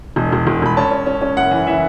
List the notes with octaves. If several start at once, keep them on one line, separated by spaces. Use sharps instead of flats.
E1
E1
E1
E1 B5
C#4 A5
C#4
C#4
C#4
F#1 F#5
E3
E3 E5